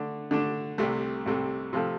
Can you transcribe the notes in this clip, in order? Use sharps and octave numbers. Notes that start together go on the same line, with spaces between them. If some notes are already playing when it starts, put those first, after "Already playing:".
Already playing: D3 A3 D4
D3 A3 D4
C2 C3 A3
C2 C3 A3
C3 F3 A3 F4 A4